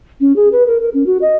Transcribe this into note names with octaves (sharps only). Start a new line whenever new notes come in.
C#4
G#4
B4
A#4
A#4
C#4
F#4
D#5